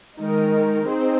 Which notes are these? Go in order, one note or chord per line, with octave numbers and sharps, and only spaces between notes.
D#3 G#3 D#4 A#4
C4 D#4 G#4 C5